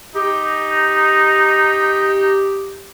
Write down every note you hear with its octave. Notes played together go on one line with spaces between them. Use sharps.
D#4 G4